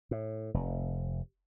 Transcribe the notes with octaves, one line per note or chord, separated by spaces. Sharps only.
A2
F1